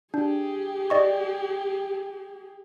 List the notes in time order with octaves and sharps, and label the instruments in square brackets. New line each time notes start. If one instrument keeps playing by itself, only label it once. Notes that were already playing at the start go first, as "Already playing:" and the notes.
[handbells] D4 [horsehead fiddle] G4 G#4
[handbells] D5 D#5 C#6